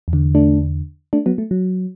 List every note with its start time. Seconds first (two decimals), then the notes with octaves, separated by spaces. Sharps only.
0.08 E2
0.13 D3
0.35 A3 D4
1.13 A3 D4
1.26 F#3 B3
1.38 A3
1.51 F#3